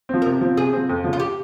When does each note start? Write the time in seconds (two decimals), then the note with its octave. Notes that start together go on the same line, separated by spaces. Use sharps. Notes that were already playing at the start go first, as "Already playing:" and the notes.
0.09 F3 C4
0.22 C3 A#4
0.41 F3 C4
0.57 C3 G#4
0.73 F3 C4
0.89 F2
1.04 C#3 F3
1.13 F4
1.20 G4